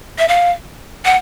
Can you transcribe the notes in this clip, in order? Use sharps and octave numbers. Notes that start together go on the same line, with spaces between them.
E5
F5
F#5